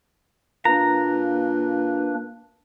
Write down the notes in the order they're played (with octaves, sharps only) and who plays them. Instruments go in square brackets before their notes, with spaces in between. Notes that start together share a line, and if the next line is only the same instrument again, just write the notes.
[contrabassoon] A#2 [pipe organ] A#3 D4 B4 [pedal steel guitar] A#5